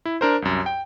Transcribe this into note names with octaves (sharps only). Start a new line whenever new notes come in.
E4
D4 A#4 C5
C2 F#2
G5